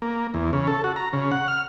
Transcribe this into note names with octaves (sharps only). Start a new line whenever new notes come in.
A#3
E2
C#3
A4
F#4
A#5
C#3
F#5
F6